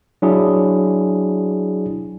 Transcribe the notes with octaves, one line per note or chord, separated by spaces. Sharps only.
F#3 D4 E4 G#4